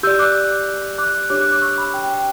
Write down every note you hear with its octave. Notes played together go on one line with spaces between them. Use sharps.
G4 D5 E6 G6
D6 F#6
D6 F#6
D4 G4 C#5 D6 F#6
D6 F#6
D6 F#6
C#6 E6
B5 D6
G5 B5
G5
G5